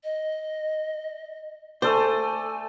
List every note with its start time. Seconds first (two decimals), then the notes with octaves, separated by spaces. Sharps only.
0.04 D#5
1.82 A3 A4 C5 D5 G#5